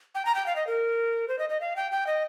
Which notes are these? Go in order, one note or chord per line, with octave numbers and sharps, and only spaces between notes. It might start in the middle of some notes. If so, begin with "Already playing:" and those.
G5
A#5
G5
F5
D#5
A#4
C5
D#5
D#5
F5
G5
G5
D#5